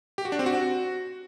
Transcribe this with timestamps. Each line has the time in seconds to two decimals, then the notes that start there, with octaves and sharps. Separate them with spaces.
0.18 G4
0.25 F#4
0.32 D4
0.39 C4
0.46 F#4